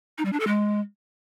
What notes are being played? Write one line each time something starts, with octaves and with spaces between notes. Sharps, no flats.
D#4
G3
D4
A4
G#3